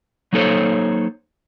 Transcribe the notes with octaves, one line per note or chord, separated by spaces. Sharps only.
F#3 A#3 D#4 A4 C5 C#5